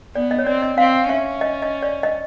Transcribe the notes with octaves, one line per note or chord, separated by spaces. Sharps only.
B3 D5
D#5
C#5
C4 D5
D#5
C4 F5
C#4 E5
D#5
D#5
D5
D#5